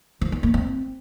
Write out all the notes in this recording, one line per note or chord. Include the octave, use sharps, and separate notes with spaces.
F3
B3
A#3
C4